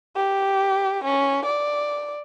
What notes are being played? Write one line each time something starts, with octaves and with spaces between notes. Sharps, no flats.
G4
C#4
D5